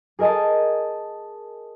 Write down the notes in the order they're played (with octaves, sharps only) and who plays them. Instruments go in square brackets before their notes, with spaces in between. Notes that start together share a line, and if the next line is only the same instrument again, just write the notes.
[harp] G#4 A#4 D#5 G#5 A5